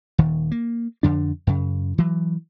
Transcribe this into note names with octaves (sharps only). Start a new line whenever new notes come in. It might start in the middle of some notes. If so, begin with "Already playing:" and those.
D#1 D#3
A#3
F2 D3 D4
F#2 C#3
E3 F#3